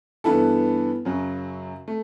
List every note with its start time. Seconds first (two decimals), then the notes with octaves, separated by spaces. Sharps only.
0.24 G2 E3 B3 E4 A4
1.05 F#2 C#3 F#3
1.88 A3